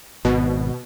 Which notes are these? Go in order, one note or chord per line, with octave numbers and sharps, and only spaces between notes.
G#1 B2